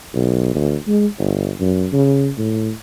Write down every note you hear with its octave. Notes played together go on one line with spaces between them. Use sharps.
B1
D2
G#3
G1
F#2
C#3
A2